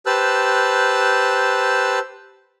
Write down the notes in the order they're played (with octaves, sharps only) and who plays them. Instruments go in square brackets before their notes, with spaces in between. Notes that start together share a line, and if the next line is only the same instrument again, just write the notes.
[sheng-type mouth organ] G4 B4 C5 A5 E6 F#6